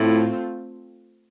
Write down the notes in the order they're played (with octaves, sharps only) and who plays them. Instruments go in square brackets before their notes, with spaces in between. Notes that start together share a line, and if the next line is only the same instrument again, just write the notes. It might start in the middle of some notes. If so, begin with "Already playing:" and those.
Already playing: [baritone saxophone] A2 [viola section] A3 C4 F4